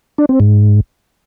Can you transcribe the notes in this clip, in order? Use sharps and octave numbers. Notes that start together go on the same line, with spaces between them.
D4
C4
G#2